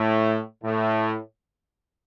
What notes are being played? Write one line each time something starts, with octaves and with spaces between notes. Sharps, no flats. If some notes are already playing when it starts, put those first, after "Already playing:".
Already playing: A2
A2